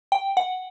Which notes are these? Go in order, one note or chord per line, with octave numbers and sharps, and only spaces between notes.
G5
F#5